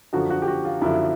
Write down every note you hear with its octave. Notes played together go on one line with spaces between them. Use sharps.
F#2 D3 F3 F#4
F#4
G4
F#4
F4
F#2 D3 F3 E4